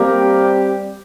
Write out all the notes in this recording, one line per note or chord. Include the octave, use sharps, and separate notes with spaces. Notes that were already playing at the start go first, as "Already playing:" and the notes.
Already playing: G3 A#3 C4 G4 A#4